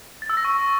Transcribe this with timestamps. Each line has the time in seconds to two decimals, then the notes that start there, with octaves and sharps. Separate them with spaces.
0.22 A6
0.30 E6
0.37 A#6
0.45 C#6